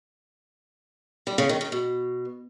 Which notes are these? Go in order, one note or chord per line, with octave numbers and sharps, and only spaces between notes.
G3
C#3
D#3
C#3
B2